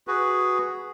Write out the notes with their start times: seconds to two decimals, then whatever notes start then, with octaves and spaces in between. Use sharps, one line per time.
0.07 F#4 G#4 B4